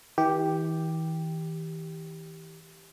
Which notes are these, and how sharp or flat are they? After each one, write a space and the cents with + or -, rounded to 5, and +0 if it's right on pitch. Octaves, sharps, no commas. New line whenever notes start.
E3 -40 G4 +0